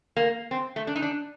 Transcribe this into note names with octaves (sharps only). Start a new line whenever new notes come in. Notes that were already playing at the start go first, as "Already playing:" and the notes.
A#3
C4
A3
D4
D#4
D4